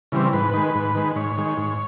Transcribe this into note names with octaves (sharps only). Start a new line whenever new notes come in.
C#3 E3 G3 C4
G#2 B4
D#3 G#3
G#2
D#3 G#3
G#2 C#5
D#3 G#3
G#2